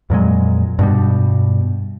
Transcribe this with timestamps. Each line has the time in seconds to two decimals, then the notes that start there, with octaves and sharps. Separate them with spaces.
0.10 F2 A#2 F#3 G#3
0.79 G2 B2 G3